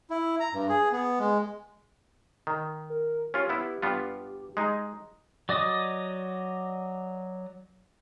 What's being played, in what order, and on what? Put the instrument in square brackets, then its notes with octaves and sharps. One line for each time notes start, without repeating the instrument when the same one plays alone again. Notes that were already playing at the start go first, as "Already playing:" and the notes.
[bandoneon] E4
A#5
G2
G#4
B3
G#3
[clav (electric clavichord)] D#3
[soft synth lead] A#4
[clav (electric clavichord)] C#4 F4 [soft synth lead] G4
[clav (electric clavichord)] B3 E4
G2 B3 F4
[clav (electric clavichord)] G#3 D#4 [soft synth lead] D#5
[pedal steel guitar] F#3 D5 D#5 D#6